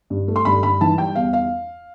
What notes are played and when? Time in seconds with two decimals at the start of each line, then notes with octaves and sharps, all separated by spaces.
0.10 G2
0.28 A3
0.36 C6
0.45 G2 B5
0.63 G2 B5
0.81 E3 A5
0.98 G3 G5
1.15 E2 F5
1.33 F5